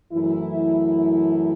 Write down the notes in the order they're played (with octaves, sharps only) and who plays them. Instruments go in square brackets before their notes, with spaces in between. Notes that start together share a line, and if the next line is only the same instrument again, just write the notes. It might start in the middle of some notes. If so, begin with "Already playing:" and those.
[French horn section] F#2 E3 A3 E4